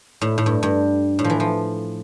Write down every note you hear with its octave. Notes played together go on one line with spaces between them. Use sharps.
A2
A2
G2
G2
A2
F3
E3
F3